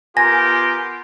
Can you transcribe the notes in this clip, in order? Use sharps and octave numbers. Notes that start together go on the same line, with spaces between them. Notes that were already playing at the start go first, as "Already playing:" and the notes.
B3 F4 G4 A#4 G#5 A#6